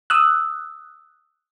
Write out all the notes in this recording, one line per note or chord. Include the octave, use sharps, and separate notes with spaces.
D#6 E6 F#6